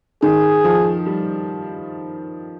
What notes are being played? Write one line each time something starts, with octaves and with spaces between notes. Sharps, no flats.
D#3 G#4
F3
G3